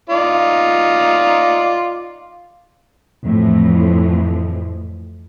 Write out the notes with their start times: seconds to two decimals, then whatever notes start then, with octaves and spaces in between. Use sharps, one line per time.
0.10 D#4 F4 D5
3.24 F2 A2 E3 F3